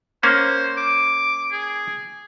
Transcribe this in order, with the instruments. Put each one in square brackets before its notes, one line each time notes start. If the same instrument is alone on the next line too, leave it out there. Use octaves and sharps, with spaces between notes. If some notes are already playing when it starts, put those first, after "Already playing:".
[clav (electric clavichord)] A#3 C#4 [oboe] C5
[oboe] D6
G#4